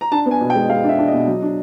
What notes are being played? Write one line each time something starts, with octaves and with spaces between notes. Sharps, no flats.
A#5
D4 A5
B3
G#5
B2
G5
G#3
G#3 F5
D4 E5
D4
D#5
B2
F#3
D4